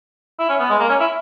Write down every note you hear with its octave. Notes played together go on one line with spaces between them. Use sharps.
E4
C#4
B3
G#3
A#3
C#4
E4